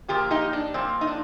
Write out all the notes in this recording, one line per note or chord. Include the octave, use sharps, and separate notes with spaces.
A#2 F3 A#3 G4 A#4
D#4 G4
D4
A#2 F3 A#3 C4
D#4
D4